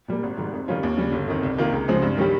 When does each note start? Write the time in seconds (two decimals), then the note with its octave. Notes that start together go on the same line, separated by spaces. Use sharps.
0.08 A#2 G3 A#3
0.23 G#1
0.37 G#2 D#3 G3
0.53 F2
0.68 D#3 G3 C#4 F4
0.83 D#2
0.97 C#3 G3
1.12 G1
1.28 F2 D#3
1.43 C2
1.58 C3 D#3 A#3 F4
1.72 C#2
1.88 C#3 F3 G#3 C4
2.02 G2
2.17 D#3 G3 C#4 G4